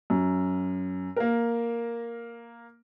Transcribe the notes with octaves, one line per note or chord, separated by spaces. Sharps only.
F#2
A#3 A#4